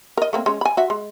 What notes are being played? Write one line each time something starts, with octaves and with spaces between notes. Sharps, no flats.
A#4 D#5
A3 A#3 C4
G#3 C#4
G#5 B5
F#4 E5
G#3